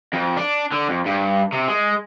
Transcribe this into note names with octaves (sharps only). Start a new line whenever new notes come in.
F2
D4
D3
F2
G2
C3
G#3